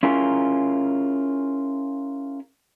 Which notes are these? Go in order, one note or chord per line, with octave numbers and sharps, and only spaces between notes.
C#4 E4 F4 G#4 A#4